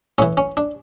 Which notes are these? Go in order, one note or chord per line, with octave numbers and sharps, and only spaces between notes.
A2 E3 C#4
C#4
D4